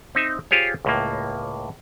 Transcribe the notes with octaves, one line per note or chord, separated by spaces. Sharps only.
C4 D#4 E5
F4 G4 G#4 C5 C#5
C#2 A2 A#3